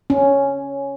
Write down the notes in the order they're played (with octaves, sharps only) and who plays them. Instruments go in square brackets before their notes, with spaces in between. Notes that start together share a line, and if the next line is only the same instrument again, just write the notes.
[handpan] C#4